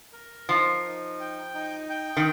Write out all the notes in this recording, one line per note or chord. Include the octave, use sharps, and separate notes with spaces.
A#4
F3 D#4
D#4
G5
D#4
G5
D#3